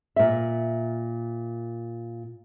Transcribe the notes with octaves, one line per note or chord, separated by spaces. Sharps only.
A#2 E5